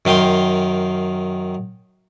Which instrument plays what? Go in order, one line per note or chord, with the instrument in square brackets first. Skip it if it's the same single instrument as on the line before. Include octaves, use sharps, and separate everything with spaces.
[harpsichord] F#2 D#3 F5 G5 C6